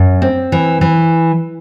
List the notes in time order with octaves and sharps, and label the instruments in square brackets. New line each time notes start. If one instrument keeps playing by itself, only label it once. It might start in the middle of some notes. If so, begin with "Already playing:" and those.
Already playing: [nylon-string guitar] F#2
C4
E3
E3